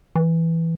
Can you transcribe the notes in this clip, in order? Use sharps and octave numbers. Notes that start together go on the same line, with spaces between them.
E3